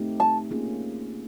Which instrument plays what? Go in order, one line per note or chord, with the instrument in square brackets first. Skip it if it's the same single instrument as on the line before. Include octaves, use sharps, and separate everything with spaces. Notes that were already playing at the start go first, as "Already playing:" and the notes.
Already playing: [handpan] A3 C4 D#4 G4
[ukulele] A5
[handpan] A#3 C#4 F4 G#4